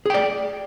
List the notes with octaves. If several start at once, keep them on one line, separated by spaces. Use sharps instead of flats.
G#4 D5 G5